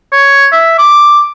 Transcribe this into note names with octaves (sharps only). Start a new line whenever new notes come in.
C#5
E5
D6